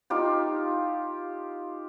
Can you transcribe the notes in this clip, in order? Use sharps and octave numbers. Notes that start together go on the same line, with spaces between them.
D#4 F4 G4